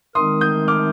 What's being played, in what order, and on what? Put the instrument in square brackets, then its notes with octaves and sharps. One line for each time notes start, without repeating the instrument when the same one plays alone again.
[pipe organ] D#3 G#3 C4 D#4 A#4 [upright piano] C6 D#6
[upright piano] D#6 G6
D6 F6